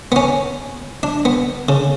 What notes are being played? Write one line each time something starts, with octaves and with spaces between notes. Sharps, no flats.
B3
C#4
D4
B3
C#3